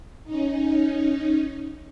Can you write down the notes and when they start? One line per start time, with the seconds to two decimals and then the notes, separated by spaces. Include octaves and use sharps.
0.24 C#4 D#4